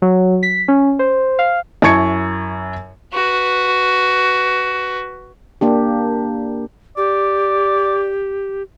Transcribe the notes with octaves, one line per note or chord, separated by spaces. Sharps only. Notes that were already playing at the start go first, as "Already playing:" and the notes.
F#3
B6
C#4
C5
F5
F#2 E4 A5 C#6 G#6 C#7
F#4 B4
A#3 D4 G4
G4 D5